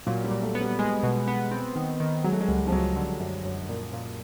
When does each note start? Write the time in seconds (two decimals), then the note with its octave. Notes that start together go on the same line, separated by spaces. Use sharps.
0.06 A#2 F#3
0.24 G3
0.31 A#2
0.42 A3
0.55 B3
0.61 G3
0.79 G#3
1.03 B2
1.28 B3
1.51 C4
1.75 D#3
2.00 D#3
2.24 F#3 G#3
2.32 A3
2.41 G#3
2.48 C#2 G3
2.67 F3
2.72 C#2 F#3
2.96 D3
3.20 F#2
3.45 F#2
3.69 A#2
3.93 A#2